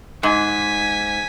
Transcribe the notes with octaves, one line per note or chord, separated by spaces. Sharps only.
G#2 G#5 B6